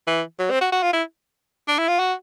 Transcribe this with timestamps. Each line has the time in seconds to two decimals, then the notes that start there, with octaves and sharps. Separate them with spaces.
0.07 E3
0.39 F#3
0.50 C4
0.61 F#4
0.72 F#4
0.83 F4
0.93 E4
1.68 D4
1.78 E4
1.88 F4
1.99 F#4